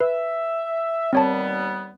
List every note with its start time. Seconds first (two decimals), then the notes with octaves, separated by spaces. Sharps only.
0.01 B4 E5
1.13 D#2 G3 B3 C4 C#5 A5